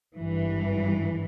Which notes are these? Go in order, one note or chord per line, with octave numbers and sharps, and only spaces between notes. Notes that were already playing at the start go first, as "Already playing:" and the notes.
G#1 G2 E3